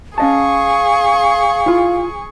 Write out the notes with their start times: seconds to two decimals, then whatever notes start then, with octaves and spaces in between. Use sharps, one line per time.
0.18 C#4 G#4 D#5 F5 A5 C#6
1.66 E4 F4